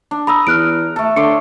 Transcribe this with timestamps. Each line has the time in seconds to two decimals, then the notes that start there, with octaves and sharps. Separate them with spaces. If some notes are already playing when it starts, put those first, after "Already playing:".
0.11 D4
0.27 A#5 B5 D#6 E6
0.47 E2 F6 F#6 D7
0.96 A3 A4
1.16 D3 C#5 D5 C6 C#7